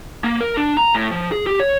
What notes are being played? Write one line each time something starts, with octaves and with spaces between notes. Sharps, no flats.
A#3
A#4
D4
A#5
A2
F3
G#4
G4
C#5